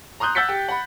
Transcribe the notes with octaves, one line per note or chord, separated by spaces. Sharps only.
A#5 C6 D#6 F#6 G6
F#5 E6 G6 A6 B6 C#7
G4
F#5 B5